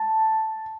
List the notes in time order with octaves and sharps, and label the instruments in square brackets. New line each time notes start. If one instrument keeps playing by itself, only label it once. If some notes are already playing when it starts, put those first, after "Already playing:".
Already playing: [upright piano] A5